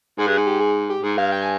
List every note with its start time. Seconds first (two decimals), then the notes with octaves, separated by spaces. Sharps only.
0.18 G#2 G#4
0.27 G2
0.32 G#4
0.37 G#2
0.47 G4
0.60 G#4
0.90 G4
1.03 G#2 G#4
1.18 G2 F5
1.32 G5
1.42 G#5